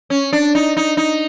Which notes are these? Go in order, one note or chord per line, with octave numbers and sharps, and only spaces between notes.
C#4
D4
D#4
D#4
D#4